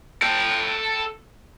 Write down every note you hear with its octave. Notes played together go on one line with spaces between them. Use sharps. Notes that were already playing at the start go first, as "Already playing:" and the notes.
A4 G5